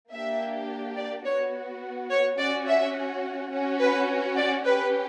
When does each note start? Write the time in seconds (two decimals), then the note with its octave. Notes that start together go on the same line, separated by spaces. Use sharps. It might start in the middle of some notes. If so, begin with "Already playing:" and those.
0.13 A#3 D4 G4 E5
0.97 D5
1.26 B3 F#4 C#5
2.11 C#5
2.39 C#4 F#4 D5
2.67 E5
3.52 C#4 F#4
3.80 B4
4.37 D5
4.65 C#4 G4 B4